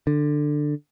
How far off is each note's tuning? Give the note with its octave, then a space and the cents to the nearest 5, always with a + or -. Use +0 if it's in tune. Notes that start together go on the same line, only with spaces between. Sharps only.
D3 +15